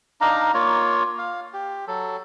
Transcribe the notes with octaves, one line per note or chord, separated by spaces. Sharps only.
D4 D#4 F5 A#5
A#3 F4 C#5
F5
G4
F#3 A4